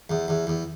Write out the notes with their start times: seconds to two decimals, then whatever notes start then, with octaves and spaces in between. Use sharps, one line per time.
0.10 E2
0.28 E2
0.47 E2